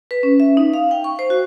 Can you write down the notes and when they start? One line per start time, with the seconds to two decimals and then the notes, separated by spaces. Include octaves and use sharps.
0.11 B4
0.23 C#4
0.40 E5
0.57 D#4
0.74 F5
0.91 G5
1.04 C#6
1.19 C5
1.30 F#4